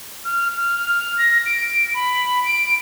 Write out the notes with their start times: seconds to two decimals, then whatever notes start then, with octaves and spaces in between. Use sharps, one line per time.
0.25 F6
0.57 F6
1.18 A#6
1.46 D7
1.94 B5
2.44 D7